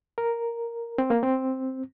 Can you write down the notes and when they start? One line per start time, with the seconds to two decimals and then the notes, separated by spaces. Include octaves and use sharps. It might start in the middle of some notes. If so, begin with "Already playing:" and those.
0.18 A#4
0.98 C4
1.10 A#3
1.23 C4